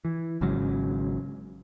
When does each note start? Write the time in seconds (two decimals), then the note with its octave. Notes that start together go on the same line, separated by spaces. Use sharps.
0.05 E3
0.41 G#1 G#2 C#3 F#3